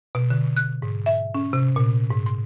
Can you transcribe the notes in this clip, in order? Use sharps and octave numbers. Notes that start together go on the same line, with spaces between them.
B2
D3
F#6
G#2
E5
C#4
C3
A#2
G#2
C6